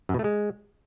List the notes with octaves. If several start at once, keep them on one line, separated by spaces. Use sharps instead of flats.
F#2
B2
A3
G#3